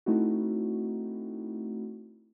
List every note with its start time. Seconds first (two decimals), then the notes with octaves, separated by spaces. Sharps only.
0.06 A3 C4 D#4 E4 F#4